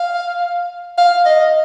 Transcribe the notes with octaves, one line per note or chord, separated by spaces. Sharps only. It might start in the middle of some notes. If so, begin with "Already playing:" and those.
Already playing: F5
F5
D#5